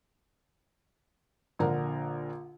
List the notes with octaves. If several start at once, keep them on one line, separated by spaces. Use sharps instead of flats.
A#1 D3 A#4 A#5